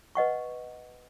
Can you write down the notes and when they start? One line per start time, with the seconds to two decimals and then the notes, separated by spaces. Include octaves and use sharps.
0.15 B4 D#5 F#5 C#6